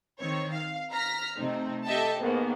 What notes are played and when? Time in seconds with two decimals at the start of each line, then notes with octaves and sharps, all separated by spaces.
0.20 D#3 C4 C#5
0.53 F5
0.92 A#5 F6 A#6 B6
1.37 C3 A3 C4 D#4
1.86 G4 A4 D#5 E5 G5 A5
2.21 G#2 D#3 A#3 B3